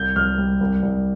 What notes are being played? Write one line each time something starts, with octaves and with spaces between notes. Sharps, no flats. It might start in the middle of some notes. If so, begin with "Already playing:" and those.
Already playing: C2 G6
C2 F6
G3
C2
C2